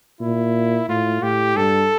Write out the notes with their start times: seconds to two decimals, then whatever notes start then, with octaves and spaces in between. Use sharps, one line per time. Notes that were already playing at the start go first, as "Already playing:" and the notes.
0.21 A#2 E4
0.88 A2 F4
1.23 A2 G4
1.57 G2 A4